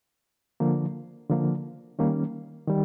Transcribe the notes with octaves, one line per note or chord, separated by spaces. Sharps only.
D3 F3 A#3
D3 F3 A#3
D#3 G3 A#3 C#4
D#3 G3